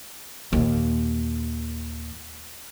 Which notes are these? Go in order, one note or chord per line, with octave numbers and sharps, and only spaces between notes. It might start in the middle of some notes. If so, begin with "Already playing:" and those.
D#2 A#2